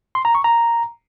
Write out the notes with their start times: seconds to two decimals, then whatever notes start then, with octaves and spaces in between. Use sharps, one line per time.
0.15 C6
0.25 A#5
0.35 C#6
0.44 A#5